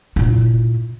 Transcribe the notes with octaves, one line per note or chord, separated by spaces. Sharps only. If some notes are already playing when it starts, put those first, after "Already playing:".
A#2 E4